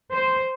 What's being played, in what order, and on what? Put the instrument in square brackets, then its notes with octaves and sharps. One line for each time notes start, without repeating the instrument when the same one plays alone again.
[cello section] C5